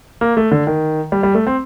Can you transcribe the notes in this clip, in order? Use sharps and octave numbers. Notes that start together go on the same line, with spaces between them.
A#3
A3
D3
D#3
G3
G3
A3
C4